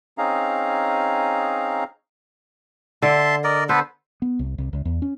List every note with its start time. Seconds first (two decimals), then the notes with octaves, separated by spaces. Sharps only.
0.18 C4 C#4 D#4 G#4 F5 A#5
3.02 D3 E5 A5 C6
3.44 A#4 D5 D#5
3.69 B3 A4 B4 C5
4.22 B3
4.39 C2
4.58 C2
4.73 C#2
4.85 E2
5.02 C#4